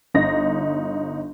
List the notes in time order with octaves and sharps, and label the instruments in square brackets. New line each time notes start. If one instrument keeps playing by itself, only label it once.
[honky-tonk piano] G1 D#4 A#6